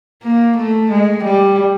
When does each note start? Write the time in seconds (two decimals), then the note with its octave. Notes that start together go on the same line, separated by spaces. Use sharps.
0.23 A#3
0.57 A3
0.90 G#3
1.23 G3